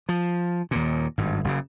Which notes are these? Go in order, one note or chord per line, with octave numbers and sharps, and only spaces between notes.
F3
D#2 A#2
G#1 G2
F#1 F#2 A2 C#3